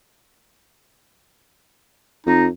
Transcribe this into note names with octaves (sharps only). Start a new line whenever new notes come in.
F2 D#4